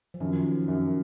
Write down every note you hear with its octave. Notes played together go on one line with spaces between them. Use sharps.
F3
F#2 D#3
F#2